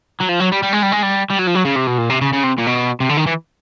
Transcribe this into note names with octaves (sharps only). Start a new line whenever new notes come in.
F#3
F3
F#3
G3
G3
G#3
G3
G#3
G3
G3
F#3
F3
F#3
C#3
C3
B2
A#2
C3
C#3
C#3
C3
A#2
B2
C3
D3
D#3
E3